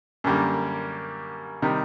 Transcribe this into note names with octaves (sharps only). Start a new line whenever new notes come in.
F#2 D3 G3 A#3
C3 D#3 G3